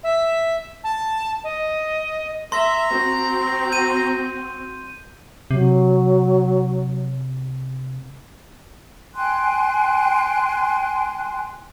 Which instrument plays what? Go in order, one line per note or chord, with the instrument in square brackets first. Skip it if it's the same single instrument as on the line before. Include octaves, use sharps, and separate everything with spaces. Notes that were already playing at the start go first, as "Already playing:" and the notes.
[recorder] E5
A5
D#5
[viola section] E5 [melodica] A#5 [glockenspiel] C6
[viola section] C4 F#4
[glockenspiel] G6 D#7
[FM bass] C3 [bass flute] F#3
[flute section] G5 G#5 C6 F#6